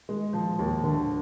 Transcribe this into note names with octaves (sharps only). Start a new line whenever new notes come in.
G#3
F3
D#2
D3